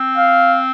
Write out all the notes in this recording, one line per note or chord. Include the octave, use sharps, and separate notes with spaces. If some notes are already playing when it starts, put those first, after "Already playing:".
Already playing: C4
F5